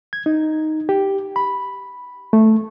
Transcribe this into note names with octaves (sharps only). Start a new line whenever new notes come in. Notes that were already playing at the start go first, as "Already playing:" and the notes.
G#6
D#4
G4
B5
A3